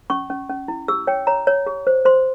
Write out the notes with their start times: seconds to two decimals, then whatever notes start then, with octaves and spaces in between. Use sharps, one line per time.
0.10 C#4 C#6
0.30 C#4
0.49 C#4
0.68 E4
0.88 G4 E6
1.07 C#5 G5
1.27 C#5 A#5
1.47 C#5
1.66 G4
1.87 C5
2.05 C5 C6